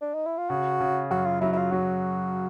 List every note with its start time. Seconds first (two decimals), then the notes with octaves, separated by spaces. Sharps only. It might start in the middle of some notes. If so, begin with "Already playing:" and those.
0.01 D4
0.14 D#4
0.26 E4
0.38 F4
0.50 C#3 F#4
0.80 C#3
1.11 F#2 F#4
1.26 F4
1.41 F#3 E4
1.53 E4
1.57 F4
1.71 F#3 F#4